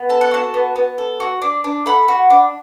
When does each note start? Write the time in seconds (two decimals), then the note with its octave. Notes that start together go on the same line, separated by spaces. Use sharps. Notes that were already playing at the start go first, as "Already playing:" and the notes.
Already playing: B3
0.09 A4 A5
0.21 F#5
0.31 F#4 E5 A5
0.54 B3
0.76 B3
0.98 A4
1.20 F#4
1.42 D4
1.64 D4
1.86 A4 F#5 B5
2.08 F#4
2.30 D4